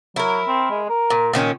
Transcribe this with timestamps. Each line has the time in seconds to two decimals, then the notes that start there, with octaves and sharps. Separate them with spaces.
0.16 F#3 E4 A#4
0.47 C4
0.70 G#3
0.89 A#4
1.10 A#2
1.33 A#2 D#3 C#4